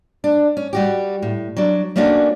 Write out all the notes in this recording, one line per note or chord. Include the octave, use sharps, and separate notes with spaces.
D4
C#4
G3 F#4 G4
A2
F#3 D4
A3 A#3 C#4 D4 F4 F#4